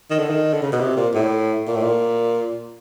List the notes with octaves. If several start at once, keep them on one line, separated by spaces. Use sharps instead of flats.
D#3
D3
D#3
D3
C#3
B2
C3
A#2
A2
A#2
A2
A#2